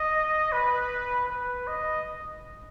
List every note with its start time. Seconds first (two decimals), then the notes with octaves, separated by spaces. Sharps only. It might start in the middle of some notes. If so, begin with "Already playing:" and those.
Already playing: D#5
0.52 B4
1.29 B4
1.67 D#5